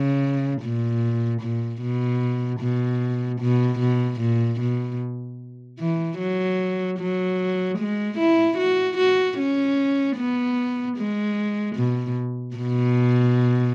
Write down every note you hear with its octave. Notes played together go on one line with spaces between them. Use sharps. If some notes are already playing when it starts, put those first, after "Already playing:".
Already playing: C#3
A#2
A#2
B2
B2
B2
B2
A#2
B2
E3
F#3
F#3
G#3
E4
F#4
F#4
C#4
B3
G#3
B2
B2